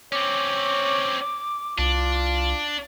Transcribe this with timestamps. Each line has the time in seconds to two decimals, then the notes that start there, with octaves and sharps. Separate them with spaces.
0.13 C4 C#4 C#5 D6
1.78 C2 D4 F4